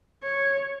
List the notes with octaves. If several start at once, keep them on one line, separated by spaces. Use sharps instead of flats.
C#5